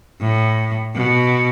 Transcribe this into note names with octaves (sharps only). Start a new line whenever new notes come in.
A2
B2